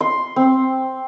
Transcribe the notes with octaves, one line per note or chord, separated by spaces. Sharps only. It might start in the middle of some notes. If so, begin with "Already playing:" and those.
C6
C4